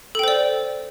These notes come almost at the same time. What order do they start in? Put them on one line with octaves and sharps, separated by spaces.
A4 G5 C5 D5